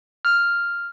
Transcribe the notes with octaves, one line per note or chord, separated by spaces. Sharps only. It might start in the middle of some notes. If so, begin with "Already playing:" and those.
F6